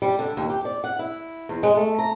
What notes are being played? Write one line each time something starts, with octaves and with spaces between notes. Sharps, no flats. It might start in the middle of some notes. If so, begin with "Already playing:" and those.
G3
D3
D#2
G4
D5
F#5
E4
E2
G#3
A3
A#5